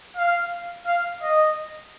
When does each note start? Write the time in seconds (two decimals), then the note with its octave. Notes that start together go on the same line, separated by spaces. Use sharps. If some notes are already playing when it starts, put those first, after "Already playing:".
0.17 F5
0.87 F5
1.22 D#5